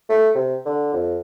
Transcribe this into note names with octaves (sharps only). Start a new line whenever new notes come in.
A3
C3
D3
F2